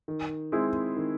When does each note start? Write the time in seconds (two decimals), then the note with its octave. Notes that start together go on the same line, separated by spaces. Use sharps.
0.08 D#3
0.52 G#3 C4 E4 G#4
0.96 D#3